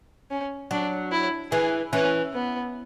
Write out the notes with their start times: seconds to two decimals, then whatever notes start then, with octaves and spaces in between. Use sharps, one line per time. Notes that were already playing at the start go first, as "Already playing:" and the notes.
0.31 C#4
0.71 F#3 D4
1.12 E4
1.52 E3 G#4
1.93 E3 C#4
2.34 B3